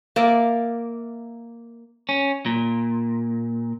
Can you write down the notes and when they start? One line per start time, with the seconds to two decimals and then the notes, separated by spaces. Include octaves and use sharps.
0.16 A#3 D5 E5
2.09 C#4
2.46 A#2